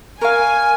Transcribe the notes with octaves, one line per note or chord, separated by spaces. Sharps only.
A#4 C#5 F5 G#5